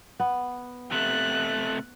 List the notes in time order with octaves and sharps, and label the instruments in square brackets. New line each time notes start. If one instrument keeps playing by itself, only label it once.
[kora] B3
[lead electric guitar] C3 A3 [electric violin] F#6